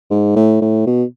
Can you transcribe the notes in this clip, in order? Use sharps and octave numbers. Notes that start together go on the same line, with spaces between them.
G#2
A2
A2
B2